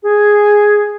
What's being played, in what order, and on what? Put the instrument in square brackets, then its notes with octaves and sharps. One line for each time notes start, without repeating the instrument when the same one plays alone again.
[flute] G#4